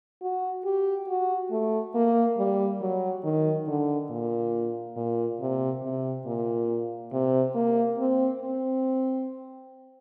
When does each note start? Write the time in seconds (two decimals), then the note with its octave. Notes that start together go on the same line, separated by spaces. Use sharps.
0.22 F#4
0.65 G4
1.08 F#4
1.51 A3
1.95 A#3
2.38 G3
2.81 F#3
3.24 D#3
3.67 D3
4.10 A#2
4.97 A#2
5.40 C3
5.83 C3
6.26 A#2
7.12 C3
7.55 A#3
7.99 C4
8.41 C4